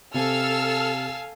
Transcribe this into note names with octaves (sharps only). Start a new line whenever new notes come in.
C3 A4 F5 G#5 E6 F6